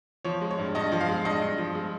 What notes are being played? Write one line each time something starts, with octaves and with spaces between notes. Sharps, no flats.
F3 C#5
G#3
C#5
G2
G2 D#5
F3
F5
G#3
G2 D#5
G2
F3
G#3